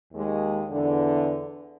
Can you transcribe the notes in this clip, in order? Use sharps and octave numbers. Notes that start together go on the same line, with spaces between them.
D#2 G#3
E2 D3